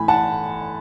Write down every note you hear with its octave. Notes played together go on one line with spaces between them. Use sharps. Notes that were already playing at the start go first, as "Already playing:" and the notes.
Already playing: A2 E3 G#5 B5
F#5 A5